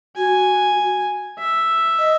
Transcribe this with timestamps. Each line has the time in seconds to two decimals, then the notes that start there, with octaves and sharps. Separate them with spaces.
0.16 F#4 G#5
1.39 E5
1.99 D#5